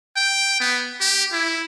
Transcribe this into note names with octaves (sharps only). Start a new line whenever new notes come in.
G5
B3
G4
E4